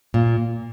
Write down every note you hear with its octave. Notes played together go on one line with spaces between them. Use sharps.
A#2